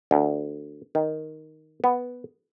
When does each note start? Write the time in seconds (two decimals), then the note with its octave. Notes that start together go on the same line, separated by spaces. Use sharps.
0.11 D2
0.95 D#3
1.84 B3